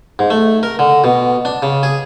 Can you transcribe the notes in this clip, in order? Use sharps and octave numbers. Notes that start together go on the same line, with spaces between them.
G#2
A3
A#4
D3
B2
D4
C#3
G#4